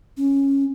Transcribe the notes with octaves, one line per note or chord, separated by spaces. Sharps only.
C#4